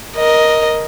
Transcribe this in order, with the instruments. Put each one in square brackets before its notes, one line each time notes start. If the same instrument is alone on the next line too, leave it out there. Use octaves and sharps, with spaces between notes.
[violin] A#4 D#5